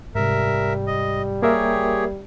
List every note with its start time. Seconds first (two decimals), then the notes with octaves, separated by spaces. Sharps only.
0.15 G#2 C3 G3 A#4 E5
0.87 D#5
1.42 A#3 G4 G#4 A#4 C#5 E5